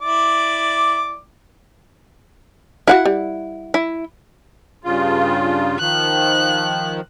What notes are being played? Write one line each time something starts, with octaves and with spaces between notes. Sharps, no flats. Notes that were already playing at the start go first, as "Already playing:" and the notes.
E4 D5 D6
E4 F#4 F5 F#5
G3
E4
G2 C#3 F4
D#3 F3 F#6